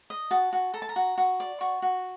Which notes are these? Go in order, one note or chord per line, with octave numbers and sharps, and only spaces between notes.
D#5
F#4 A5
F#4
A4 A#5
A5
A#5
F#4
F#4
D5
F#4 C#6
F#4